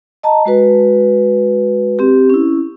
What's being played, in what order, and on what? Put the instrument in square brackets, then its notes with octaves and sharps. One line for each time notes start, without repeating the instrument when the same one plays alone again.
[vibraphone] D#5 A5 A#5
G#3 F#4 B4
C4 G4
C#4 E4